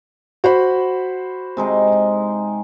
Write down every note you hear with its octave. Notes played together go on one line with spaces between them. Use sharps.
F#4 C5 B5
C3 G#3 D#4